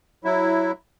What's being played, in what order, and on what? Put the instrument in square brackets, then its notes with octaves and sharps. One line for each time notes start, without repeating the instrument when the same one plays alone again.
[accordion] F#3 E4